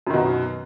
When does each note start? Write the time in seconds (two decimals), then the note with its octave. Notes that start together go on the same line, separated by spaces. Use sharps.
0.07 F#2
0.10 D#3
0.13 B2